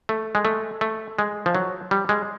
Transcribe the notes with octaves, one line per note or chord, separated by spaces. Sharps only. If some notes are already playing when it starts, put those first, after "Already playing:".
A3
G#3
A3
A3
G#3
F3
F#3
G3
G#3